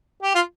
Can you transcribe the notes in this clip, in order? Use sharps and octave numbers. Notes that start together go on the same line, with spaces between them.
G4
F4